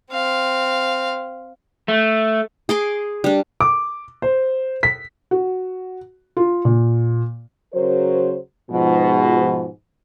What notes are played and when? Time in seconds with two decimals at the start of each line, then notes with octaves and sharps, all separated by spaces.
0.12 C4 F5
1.88 A3
2.69 G#4 C6 D6
3.24 G3 D4
3.61 D6
4.22 C5
4.83 B6
5.31 F#4
6.37 F4
6.65 A#2
7.74 C#3 F#3 A#4 C5
8.70 G#2 B2 F3